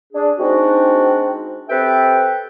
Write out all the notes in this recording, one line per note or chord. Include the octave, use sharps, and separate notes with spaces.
D4 G#4
G#3 C4 D4 D#4 F#4
C4 G4 A4 B4 E5 G5